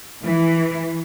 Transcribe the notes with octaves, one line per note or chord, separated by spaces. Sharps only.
E3